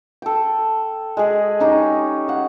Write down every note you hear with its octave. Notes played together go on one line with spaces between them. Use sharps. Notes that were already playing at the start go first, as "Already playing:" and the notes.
A4 G5
G#3 G#4
C#4 D#4 G4
F5 F#5